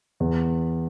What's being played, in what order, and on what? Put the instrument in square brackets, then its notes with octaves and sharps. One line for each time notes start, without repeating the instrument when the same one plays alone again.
[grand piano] E2